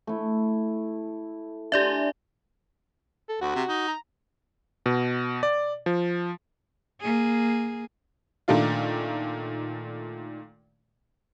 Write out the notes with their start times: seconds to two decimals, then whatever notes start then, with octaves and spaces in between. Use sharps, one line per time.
0.07 A3 E4
1.72 D4 G4 D5 E5 G#5
3.29 A4
3.41 D2 F#4
3.55 C3
3.69 D#4
3.88 A#5
4.86 B2
5.43 D5
5.86 F3
7.01 A#3 G#4
8.48 A#2 D#3 A3 D4 F4